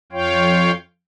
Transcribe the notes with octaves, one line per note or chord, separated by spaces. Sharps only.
F2 F4 C#5 F5 G5